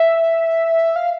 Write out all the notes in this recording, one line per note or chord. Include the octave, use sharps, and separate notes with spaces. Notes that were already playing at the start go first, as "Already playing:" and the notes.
Already playing: E5
F5